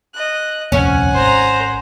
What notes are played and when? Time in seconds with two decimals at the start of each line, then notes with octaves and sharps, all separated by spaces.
0.13 D#5 F#6
0.72 D#1 C2 F2 C#4 F#5 G#5
1.14 G#1 C5 A#5